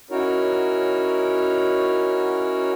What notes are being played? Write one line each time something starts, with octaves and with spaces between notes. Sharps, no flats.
C#4 D#4 E4 F#4 A#4 C#5